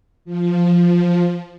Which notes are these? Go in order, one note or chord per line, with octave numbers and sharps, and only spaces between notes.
F3